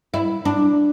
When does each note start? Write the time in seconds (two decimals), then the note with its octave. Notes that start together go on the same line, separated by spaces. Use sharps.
0.14 E4
0.45 D4